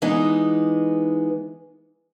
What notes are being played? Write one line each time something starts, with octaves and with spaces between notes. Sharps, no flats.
E3 G#3 B3 D#4